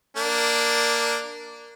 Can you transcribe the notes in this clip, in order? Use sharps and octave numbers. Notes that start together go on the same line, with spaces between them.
A#3 D4